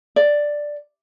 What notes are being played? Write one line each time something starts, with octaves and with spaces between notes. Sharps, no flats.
D5